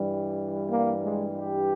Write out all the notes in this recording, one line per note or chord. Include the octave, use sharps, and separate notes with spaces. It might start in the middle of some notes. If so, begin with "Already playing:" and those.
Already playing: G2 E3 G3
A#3
G#3
G4